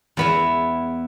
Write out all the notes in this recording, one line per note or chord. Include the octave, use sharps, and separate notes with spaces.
E2 B3 E4